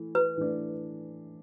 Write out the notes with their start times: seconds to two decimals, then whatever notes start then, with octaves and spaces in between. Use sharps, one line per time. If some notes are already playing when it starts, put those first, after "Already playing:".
Already playing: E3 A3
0.15 B4
0.37 E3 A3 D4